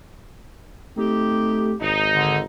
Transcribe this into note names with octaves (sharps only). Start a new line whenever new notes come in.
A3 C4 D#4 G4
G#1 D#4
D3